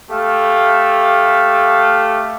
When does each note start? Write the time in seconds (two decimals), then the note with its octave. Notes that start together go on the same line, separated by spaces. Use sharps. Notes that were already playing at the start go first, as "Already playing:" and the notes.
0.10 A3 G4 F5